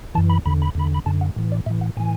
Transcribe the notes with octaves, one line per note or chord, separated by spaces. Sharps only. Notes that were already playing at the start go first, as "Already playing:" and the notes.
F#2 E3 A5
B5
E2 D3 B5
B5
E2 D3 B5
B5
F#2 D3 A5
F#5
A2 E3
D5
A2 E3 E5
F#5
A2 E3 G#5